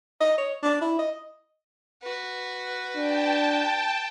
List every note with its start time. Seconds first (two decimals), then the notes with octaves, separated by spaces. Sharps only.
0.21 D#5
0.38 C#5
0.63 D4
0.81 E4
0.99 D#5
2.03 F#4 B4
2.96 D4 G5 A5